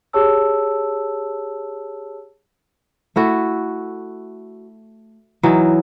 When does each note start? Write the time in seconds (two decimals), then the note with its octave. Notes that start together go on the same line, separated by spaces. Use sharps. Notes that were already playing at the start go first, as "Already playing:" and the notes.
0.13 G4 G#4 C#5 A5 E6
3.16 A3 E4 F#4
5.43 E3 F#3 D#4